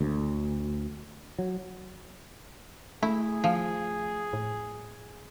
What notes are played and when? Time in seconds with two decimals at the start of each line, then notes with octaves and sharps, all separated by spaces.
0.01 D2
1.39 F#3
3.03 A3 E4 G#4
3.44 F3
4.33 A2